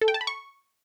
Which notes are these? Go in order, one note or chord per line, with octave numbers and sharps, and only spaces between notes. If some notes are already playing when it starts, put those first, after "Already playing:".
A4
G5
A5
B5
C#6